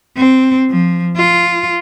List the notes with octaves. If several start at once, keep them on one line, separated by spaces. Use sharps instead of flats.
C4
F3
F4